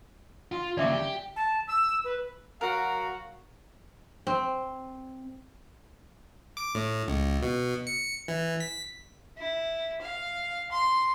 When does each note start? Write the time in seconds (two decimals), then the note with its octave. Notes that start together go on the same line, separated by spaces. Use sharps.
0.52 F4
0.77 D#2 C#3 D5 E5 D6
0.93 G4
1.36 A5
1.68 E6
2.04 B4
2.61 F#3 F#4 A#4 F5
4.27 C4
6.57 D6
6.75 A2
7.08 C#2
7.42 B2
7.87 C#7
8.28 E3
8.60 B6
9.37 E4
10.01 F5
10.71 C6